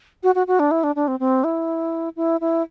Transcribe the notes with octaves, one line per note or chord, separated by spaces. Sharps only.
F#4
F#4
F#4
D4
E4
D4
D4
C4
C4
E4
E4
E4